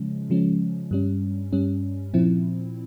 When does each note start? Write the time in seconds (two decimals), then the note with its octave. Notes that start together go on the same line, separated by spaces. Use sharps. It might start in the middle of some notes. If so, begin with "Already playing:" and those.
Already playing: C#3 F3 G#3 C#4
0.30 C#3 F3 G#3 C#4
0.91 G2 G3 C#4
1.53 G2 G3 C#4
2.14 A#2 F3 C4 E4